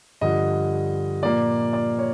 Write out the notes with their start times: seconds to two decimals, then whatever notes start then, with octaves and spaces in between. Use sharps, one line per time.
0.21 G2 D3 F3 D#5
1.23 A#2 F3 A#3 D5
1.73 D5
1.99 C#5